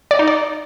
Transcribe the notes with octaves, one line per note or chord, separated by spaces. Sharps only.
D5
D#4
D5